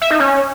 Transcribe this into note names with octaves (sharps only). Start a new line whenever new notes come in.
E5
D#4
C#4